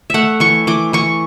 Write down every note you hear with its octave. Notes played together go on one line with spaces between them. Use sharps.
A3 E5 F#5
E3 C#6
E3 D6
E3 C#6